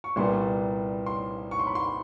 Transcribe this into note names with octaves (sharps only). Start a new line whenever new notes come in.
C#6
C2 A#2 G3 B3 C6
C6
C#6
C6
B5
C6